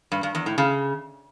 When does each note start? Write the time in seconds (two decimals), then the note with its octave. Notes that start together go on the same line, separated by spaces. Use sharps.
0.12 G2
0.23 G2
0.35 E2
0.46 A2
0.58 C#3